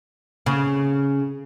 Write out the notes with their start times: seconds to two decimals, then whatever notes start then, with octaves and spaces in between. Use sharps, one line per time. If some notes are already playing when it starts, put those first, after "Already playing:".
0.46 C#3